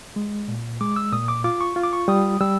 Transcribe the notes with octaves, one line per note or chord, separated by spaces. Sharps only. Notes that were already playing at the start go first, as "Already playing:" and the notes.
G#3
A#2
G#3 D6
E6
A#2 D#6
D6
F4 D6
C#6
F4
D6
C#6
G3 D#6
G3 E6